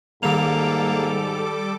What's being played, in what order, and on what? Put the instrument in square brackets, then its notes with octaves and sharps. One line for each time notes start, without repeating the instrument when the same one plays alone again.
[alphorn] G#2 [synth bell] D#3 F7 [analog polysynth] G3 A4 D6 [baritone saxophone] A#3